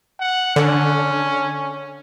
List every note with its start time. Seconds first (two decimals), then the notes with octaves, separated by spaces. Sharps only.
0.19 F#5
0.56 D3 C#4